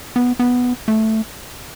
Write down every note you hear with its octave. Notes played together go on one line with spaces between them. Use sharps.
B3
B3
A3